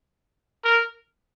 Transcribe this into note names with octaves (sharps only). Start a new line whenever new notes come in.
A#4